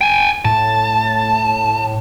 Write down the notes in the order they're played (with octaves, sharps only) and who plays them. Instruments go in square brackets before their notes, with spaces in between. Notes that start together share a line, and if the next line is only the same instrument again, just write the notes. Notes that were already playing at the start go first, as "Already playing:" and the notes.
[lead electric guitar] G5 G#5
[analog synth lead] A2 [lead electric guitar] A5